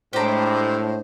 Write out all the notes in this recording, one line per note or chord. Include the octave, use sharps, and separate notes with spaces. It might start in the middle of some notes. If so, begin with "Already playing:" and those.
A2 G#3 A3 D4 G4 C5 A#5